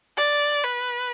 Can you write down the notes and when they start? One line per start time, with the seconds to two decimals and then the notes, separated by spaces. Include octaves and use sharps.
0.18 D5
0.64 B4